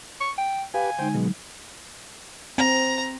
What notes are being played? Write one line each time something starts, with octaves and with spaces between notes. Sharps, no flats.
C#6
G5
G4 B4 F5 G#5
D3 G#3 D#4 C5 G5
B2 F#3 G#3
C4 A#5